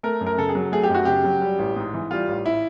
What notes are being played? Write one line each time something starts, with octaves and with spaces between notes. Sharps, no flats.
A3 A#4
F#2
A#4
C#3 A4
G#4
F#3
A3 G#4
G4
F#2 F#4
C#3 G4
F#3
G3
A1
G#2
E3
G3 F4
A1
E4